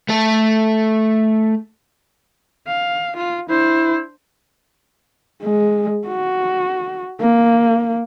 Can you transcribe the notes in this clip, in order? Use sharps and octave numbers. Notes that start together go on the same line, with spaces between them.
A3 A4
F5
F4
D4 E4 C5
G#3
F#4
A#3